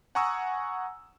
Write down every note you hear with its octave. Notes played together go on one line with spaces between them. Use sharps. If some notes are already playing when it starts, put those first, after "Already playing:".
F#5 G#5 A#5 C#6 D#6 E6